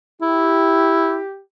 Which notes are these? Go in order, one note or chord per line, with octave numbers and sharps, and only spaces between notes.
E4 G4